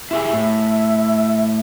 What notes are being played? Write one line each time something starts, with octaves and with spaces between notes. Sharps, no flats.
E4 G4 G#4 E5
A2